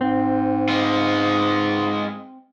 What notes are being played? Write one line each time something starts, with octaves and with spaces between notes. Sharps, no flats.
G#2 C4
G#3 F4